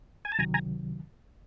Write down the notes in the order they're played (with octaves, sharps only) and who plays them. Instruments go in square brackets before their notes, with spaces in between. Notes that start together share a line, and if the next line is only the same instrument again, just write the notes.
[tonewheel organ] G#5
A5
[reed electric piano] C#2 C3 D#3 F#3 [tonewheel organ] G#5 A#5
[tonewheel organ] G#5 A#5